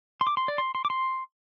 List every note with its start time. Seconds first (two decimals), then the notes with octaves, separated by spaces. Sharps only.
0.21 C6
0.27 D6
0.37 C6
0.48 D5
0.58 C6
0.75 C6
0.85 D6
0.90 C6